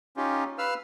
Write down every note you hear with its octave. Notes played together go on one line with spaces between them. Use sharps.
C#4 D#4 F4 G4
B4 F5 E6 F6